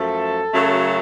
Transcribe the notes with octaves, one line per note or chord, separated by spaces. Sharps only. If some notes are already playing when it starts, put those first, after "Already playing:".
Already playing: F#2 F3 A3 A4
F#2 C#3 F#3 A3